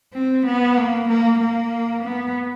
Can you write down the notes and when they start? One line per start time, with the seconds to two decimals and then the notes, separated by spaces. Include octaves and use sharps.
0.13 C4
0.46 B3
0.77 A#3
1.08 A#3
1.40 A#3
2.03 B3